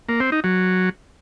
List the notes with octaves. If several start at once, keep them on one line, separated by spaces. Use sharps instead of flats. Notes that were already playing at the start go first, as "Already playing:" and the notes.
A#3
C4
D#4
F#3